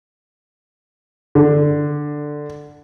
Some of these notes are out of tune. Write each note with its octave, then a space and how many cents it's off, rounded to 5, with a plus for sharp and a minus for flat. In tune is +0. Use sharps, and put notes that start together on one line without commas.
D3 +10